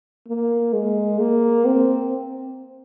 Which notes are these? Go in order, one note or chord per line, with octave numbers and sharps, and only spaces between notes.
A#3
G#3
A#3
C4